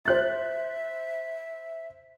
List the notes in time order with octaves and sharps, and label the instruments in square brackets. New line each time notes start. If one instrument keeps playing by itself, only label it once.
[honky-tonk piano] C5 F#6 A6 [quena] E5